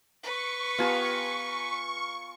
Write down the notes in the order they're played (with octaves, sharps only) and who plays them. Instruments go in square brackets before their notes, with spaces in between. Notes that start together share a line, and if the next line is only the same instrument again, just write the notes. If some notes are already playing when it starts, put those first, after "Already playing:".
[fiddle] B4 [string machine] C#6
[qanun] B3 G4 F5 [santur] F4 G#5 A#5